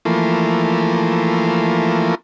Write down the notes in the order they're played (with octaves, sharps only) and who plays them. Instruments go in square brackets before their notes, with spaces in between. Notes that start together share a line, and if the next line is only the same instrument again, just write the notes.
[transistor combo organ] E3 F3 A3 A#3